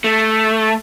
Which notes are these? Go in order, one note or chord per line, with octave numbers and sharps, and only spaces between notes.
A3